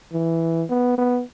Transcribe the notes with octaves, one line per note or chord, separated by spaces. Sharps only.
E3
B3
B3